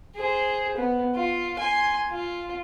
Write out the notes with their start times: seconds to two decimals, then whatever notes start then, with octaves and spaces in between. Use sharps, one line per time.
0.16 G#4 C5
0.77 B3
1.15 F4
1.58 G#5 C6
2.11 F4